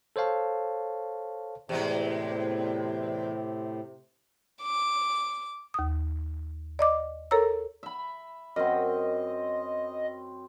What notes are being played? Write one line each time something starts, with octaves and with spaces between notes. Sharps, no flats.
A4 C5 C#5 F5 A5
E2 A2 C3 G#3
D6
D#2 D#6
D5 D#5 D6
A4 A#4 C#5 A#5 E6
E5 B5
F#2 C4 D#5